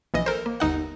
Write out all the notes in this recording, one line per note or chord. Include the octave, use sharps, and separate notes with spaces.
A#1 E3 D#5
A4 A#4 C5
A#3
G1 D#2 D#4 F#5